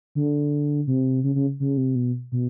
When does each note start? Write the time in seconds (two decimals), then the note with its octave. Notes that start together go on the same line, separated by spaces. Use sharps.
0.15 D3
0.87 C3
1.24 C#3
1.35 C#3
1.60 C#3
1.77 C3
1.95 B2
2.32 B2